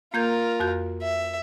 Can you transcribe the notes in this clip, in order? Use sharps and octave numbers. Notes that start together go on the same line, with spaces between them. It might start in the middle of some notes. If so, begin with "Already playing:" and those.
A#3 F4 A#4 G6 G#6
F2 F#4 G6
E5